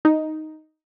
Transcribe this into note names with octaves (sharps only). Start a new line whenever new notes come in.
D#4